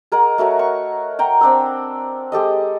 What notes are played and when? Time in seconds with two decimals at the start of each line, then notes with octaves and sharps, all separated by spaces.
0.12 G#4 A#4 D#5 F#5
0.38 A3 F#4 A#4 C#5
0.59 C#6
1.19 F#5 G5 A#5
1.41 C4 D4 E6
2.32 G#3 G4 A4 D#5